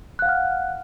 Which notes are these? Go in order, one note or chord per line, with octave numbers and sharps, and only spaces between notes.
F5 F#5 F6 F#6